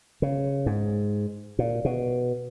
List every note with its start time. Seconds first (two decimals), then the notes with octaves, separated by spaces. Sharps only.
0.22 C#3
0.66 G#2
1.59 A#2
1.85 B2